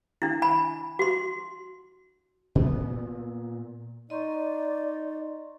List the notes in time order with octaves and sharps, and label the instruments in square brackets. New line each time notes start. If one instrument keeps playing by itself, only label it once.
[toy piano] D4 E4
G#5 B5
F#4 C6
[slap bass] A#2 B3
[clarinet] D#4 [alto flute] D5 [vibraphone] D#5 C6 C#6